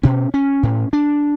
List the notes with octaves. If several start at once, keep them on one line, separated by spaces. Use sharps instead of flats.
B2 C#4
C#4
A2
D4